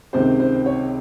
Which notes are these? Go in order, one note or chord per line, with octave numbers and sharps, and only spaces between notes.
C#2 C3 D#3 C5
C5
C#5